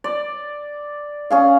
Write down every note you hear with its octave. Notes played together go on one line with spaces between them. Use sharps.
D5
C#4 G#4 F5